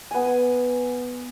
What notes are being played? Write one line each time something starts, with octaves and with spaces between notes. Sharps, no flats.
B3 G#5